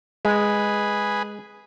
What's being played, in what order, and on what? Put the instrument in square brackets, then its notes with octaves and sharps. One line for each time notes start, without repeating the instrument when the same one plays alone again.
[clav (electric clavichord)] G#3 [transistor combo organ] G#4 B4